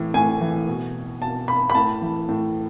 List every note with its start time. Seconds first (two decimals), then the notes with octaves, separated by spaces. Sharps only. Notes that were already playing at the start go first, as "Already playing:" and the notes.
Already playing: A2 E3
0.14 A2 G#5
0.41 E3
0.68 B2
1.21 B2 A5
1.48 B5
1.70 B5
1.75 A2 A5
2.02 E3
2.29 A2